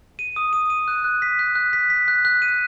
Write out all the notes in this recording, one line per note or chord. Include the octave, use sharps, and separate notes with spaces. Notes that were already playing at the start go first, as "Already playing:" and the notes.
D#7
D#6
D#7
D#7
F#6
F#6
B6
F#6
F#6
B6
B6
F#6
F#6
D#7